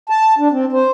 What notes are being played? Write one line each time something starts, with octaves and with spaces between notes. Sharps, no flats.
A5
D4
C4
C5